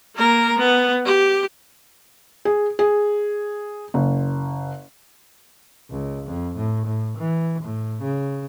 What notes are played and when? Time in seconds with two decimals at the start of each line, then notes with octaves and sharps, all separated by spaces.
0.16 A#3 A#4
0.58 B3
1.05 G4
2.45 G#4
2.79 G#4
3.94 F#1
5.90 C#2
6.26 F2
6.56 A2
6.86 A2
7.18 E3
7.62 A2
8.03 C#3